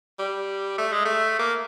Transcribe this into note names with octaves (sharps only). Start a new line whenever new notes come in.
G3
A3
G#3
A3
A#3